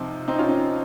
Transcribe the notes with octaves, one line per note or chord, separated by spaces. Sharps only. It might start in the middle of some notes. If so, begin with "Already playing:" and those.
Already playing: C3 F3 C4 D#4
C4 D#4
C#4 F4
C4 D#4